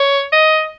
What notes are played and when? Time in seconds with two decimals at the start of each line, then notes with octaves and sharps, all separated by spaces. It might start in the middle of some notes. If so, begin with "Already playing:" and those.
Already playing: C#5
0.33 D#5